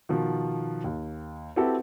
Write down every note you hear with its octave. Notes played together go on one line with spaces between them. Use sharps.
B2 D#3 F3
D#2
C4 E4 F#4 G4 A4 B4